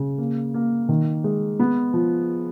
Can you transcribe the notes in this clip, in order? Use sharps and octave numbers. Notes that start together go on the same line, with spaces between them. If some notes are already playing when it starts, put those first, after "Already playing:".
Already playing: C#3
A#3
A#3
D#3
G#3
B3
F3